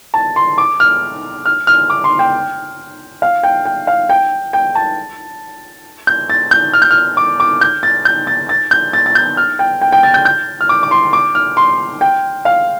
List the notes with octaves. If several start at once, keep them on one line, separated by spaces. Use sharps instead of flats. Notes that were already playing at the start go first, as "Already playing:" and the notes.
A5
C6
D6
F6
F6
F6
D6
C6
G5
F5
G5
G5
F5
G5
G5
A5
G6
A6
G6
F6
G6
F6
D6
D6
G6
A6
G6
A6
A6
G6
A6
A6
G6
F6
G5
G5
G5
A6
G6
G6
F6
D6
D6
C6
D6
F6
C6
G5
F5